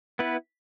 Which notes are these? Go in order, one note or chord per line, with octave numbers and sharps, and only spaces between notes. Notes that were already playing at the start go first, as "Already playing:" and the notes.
B3 E4 B4